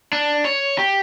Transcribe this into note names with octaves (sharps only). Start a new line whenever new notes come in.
D4
C#5
G4